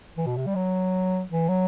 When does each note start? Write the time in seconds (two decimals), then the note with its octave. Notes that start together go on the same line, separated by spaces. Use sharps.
0.17 E3
0.26 B2
0.37 C3
0.46 G3
0.55 F#3
1.29 E3
1.48 F#3